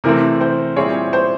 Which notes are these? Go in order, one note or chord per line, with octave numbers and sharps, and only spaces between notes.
C3 E3 A3 C4 A#4
C5
A#2 G3 C4 E4 G#4 C#5
C5